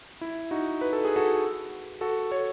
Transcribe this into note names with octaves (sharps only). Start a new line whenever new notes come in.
E4
D#4 F#4
B4
A4
G#4
F#4 A4
F#4 A4
A4 C#5